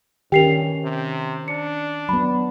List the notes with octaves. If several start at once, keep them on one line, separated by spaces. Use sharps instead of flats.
G2 D#3 C#4 G4 A#4 G5 C7 F7
C3
D4 C#7
F#3 B3 B5